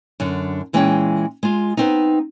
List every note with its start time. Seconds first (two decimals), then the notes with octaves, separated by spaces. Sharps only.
0.20 F#2 D3
0.73 A#2 E3 G#3 C#4 G#4 G5
1.43 G#3 F4
1.77 B3 C4 D#4